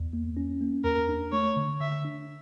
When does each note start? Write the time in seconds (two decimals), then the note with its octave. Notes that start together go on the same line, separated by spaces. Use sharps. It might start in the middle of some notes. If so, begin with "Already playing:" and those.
Already playing: E2
0.13 A#3
0.37 C#4
0.61 A#3
0.84 E2 A#4
1.09 D4
1.32 A3 C#5
1.56 D3
1.80 D3 E5
2.05 D4